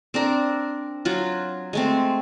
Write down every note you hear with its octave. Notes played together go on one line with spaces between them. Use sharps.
C4 D4 A#4
F#3 F4
G#3 A3 C4